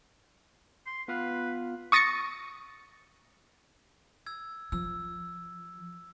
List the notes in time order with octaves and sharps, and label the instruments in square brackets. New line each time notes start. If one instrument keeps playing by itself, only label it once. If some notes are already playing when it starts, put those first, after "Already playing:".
[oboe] C6
[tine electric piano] B3 F4 F5 [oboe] B4
[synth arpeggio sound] C#6 D#6 A6 A#6 C#7
[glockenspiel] E6 G#6
[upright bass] F3 [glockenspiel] E6